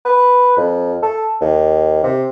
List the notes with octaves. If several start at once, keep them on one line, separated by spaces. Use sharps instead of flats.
B4
F2
A4
D#2
C3